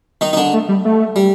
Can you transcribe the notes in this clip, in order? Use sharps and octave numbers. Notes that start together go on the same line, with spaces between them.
D#3 D#4
D#4
D3 D4
A3
G3
A3
G3